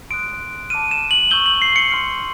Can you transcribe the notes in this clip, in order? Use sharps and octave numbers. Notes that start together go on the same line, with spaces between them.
C6 D#6 F#6 D7
A5 D6 F6 D#7
E7
F#7
C#6 E6 G6 G7
F#7
C7
C#7
C6 F6